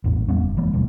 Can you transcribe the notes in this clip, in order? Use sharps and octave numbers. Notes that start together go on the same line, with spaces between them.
A1 E2 A#2
G3 B3 C#4
F#1
E3 F#3 G#3 A#3
E1 D2 B2 G3